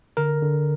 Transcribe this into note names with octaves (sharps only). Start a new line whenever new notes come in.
D3 A#4
D3